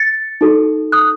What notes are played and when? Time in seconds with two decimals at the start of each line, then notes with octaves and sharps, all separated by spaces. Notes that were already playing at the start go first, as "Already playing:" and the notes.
Already playing: A6 C#7
0.41 D#4 F#4 A4
0.92 D#6 F#6